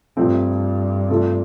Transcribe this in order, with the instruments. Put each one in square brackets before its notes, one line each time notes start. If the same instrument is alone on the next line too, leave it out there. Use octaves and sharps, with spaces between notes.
[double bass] G2 [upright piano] C3 F3 A3 C4
[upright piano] C3 A3 F4 A4